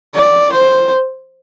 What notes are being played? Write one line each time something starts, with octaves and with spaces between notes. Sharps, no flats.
D5
C5